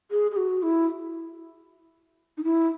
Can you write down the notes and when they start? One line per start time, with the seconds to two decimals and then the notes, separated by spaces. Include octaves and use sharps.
0.11 G#4
0.31 G#4
0.37 F#4
0.63 E4
2.38 D#4
2.44 E4